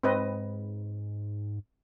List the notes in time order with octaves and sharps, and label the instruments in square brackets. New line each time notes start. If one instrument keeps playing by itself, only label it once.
[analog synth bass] G#2 [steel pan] C4 B4 D#5